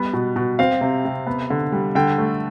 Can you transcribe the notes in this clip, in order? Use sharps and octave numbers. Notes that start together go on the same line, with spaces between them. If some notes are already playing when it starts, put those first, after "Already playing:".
Already playing: G3 B3
B2
B2
C4 F5
C3
C3
B3
D3
G3
D3 G5
A3